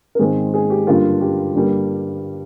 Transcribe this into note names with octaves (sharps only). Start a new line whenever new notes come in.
A#4
G#2 D#3 G#3 C4 G#4
G#4
G4
G2 D3 G3 A#3 F4
G4
G2 D3 G3 A#3